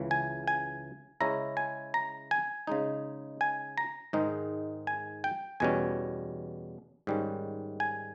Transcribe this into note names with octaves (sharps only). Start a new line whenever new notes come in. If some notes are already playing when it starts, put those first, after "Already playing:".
Already playing: C#2 C#3 E3
G#5
G#5
C#3 G#3 C#4 E4 A#5
G#5
A#5
G#5
C#3 G#3 D#4
G#5
A#5
G#2 D#3 G#3 D#4
G#5
G5
E2 B2 G3 C#4 G#5
G#2 D#3 G3 C#4
G#5